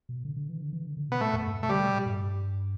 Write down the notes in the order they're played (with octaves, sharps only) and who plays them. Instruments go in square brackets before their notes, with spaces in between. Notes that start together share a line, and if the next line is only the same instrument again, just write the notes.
[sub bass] B2
D3
D3
E3
D3
E3
D3
D3
[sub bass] B2 [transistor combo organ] B3
[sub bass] A2 [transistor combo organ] A3
[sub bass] E2
G2
[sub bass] B2 [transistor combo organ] A3
[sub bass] D3 [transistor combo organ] G3
[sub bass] B2
A2
G2